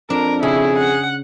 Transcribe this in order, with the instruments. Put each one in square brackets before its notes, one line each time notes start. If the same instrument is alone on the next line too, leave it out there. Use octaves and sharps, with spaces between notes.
[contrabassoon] F2 [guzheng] D4 [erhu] A#4
[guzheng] C#3 [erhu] E4 [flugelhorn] G#4
[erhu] F#5